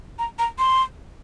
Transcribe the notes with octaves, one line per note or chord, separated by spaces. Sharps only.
A#5
A#5
C6